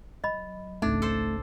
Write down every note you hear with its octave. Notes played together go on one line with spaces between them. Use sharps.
F#3 D#5 B5
G#1 C#2 A3 D4 D#4
A4 C5